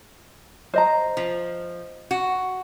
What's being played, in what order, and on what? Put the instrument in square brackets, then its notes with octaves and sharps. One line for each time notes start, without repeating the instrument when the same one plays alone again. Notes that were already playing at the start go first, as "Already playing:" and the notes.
[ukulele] C5 D#5 A#5
[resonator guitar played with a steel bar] F3
F#4